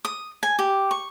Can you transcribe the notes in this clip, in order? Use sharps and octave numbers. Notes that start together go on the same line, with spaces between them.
D#6
G#5
G4
C#6